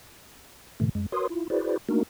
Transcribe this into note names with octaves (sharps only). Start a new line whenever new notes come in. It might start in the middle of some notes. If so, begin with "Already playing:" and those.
G#2 B2 D3 E3 A3
F#2 G#3
F#4 A#4 B4 C#5 C6 D#6
E4 F4
E4 F#4 G#4 B4 C5 D5
A3 A#3 D4 D#4 F#4 A#4